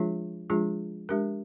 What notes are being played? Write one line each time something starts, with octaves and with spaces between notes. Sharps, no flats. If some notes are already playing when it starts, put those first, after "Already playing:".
Already playing: F3 G#3 D4 F4 G#4
F3 G#3 D4 F4 G#4
G#3 D4 G4 A#4